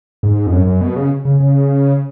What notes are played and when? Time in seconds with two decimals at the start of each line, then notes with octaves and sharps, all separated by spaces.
0.23 G#2
0.47 F2
0.53 F#2
0.67 F#2
0.81 B2
0.96 C#3
1.25 C#3
1.40 C#3